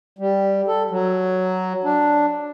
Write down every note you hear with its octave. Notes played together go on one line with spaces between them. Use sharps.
G3
A4
F#3
D4